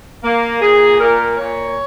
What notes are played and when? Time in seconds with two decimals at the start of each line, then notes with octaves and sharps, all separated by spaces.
0.23 A#3
0.61 A#2 G#4
0.99 A#2 A#4
1.38 A#2 C#5